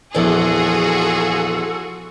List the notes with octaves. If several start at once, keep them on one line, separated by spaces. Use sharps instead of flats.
A#1 E2 F4 F#4 G#4 A4